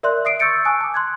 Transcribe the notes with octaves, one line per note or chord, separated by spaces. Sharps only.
A#4 D5 E5 C6 F#6
E5 D#6 C7 D7
C#6 E6 G6 A6 C#7 D7
G#5 A5 C#6 D#6 E6 F#6
A5 D6
C6 F#6 G#6